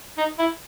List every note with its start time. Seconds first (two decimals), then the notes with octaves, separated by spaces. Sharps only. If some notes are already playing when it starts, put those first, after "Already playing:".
0.18 D#4
0.39 E4